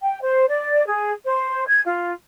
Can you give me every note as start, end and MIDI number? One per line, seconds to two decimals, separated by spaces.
0.02 0.19 79
0.21 0.45 72
0.48 0.83 74
0.85 1.12 68
1.25 1.66 72
1.67 1.80 92
1.85 2.12 65